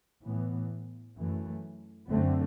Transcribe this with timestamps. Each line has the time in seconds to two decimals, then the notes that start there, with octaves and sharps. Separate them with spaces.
0.24 A2 E3 B3
1.17 F#2 E3 A3
2.10 F#2 D3 A3 C4